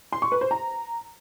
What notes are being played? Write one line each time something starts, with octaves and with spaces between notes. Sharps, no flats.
C6
C#6
B4
C5
A#5